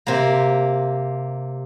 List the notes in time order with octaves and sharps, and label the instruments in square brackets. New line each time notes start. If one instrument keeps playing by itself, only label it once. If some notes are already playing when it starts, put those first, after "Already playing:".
[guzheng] C3 A#3